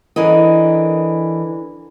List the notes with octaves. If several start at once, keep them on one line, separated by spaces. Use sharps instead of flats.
D3 E3 A#4 D#5